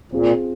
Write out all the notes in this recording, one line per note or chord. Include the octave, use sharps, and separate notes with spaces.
A#2 C4 F4 G#4